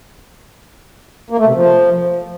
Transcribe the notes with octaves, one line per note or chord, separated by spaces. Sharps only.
A#3
A3
C3
F3